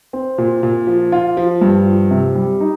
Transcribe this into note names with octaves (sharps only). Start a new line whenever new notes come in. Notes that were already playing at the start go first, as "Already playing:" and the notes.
C4
A#2
A#2
F3
F4
F3
G2
F3
C3
G3
D#4